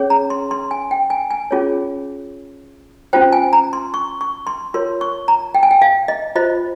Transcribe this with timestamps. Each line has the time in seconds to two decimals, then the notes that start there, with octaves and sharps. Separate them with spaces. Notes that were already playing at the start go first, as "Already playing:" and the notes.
Already playing: C#4 G#4 C#5
0.10 A#5
0.30 C6
0.51 C6
0.71 G#5
0.91 G5
1.10 G#5
1.30 G#5
1.51 C#4 F4 G#4 C#5
3.13 C#4 F4 C5 G5
3.33 G#5
3.53 A#5
3.73 C6
3.94 C#6
4.21 C#6
4.47 C6
4.74 F4 A#4 C#5 C6
5.01 C#6
5.28 A#5
5.55 G5
5.63 G#5
5.71 G5
5.82 F5
6.08 D#5
6.36 F4 C5 D#5